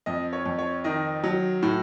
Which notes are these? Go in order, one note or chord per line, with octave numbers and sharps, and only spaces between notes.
F2 D#5
C#5
F2
C#5
D#3 D#5
F#3
A2